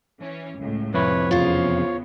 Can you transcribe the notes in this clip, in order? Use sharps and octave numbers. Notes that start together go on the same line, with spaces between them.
E3 C#4
C#2 A2
F2 C3 E4 B4 C#5
E2 C#3 B3 F4 C5 C#5